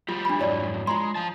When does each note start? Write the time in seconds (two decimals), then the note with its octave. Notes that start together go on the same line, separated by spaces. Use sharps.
0.09 F3 G3 F4
0.25 D4 B5
0.39 F2 G#2 F#3 E4 C#5 D5
0.87 G#3 F4 A#5 C6
1.15 F3 A5